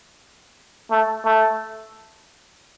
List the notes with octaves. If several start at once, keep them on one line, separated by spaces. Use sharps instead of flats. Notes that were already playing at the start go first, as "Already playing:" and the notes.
A3
A3